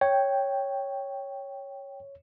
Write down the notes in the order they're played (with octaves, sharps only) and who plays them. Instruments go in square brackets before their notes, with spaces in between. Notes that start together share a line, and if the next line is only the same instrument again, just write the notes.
[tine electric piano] C#5 [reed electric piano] G5